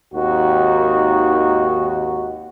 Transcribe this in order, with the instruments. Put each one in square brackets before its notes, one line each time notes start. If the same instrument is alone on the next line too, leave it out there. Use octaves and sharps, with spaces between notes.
[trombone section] G#1 D#2 D#4 F#4